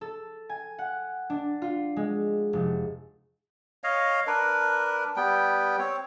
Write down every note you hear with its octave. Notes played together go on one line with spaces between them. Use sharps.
A4
G#5
F#5
D4
F4
G#3
F1
C#5 D#5 F5
D4 A#4 B4
G3 B3 G5
C4 C#5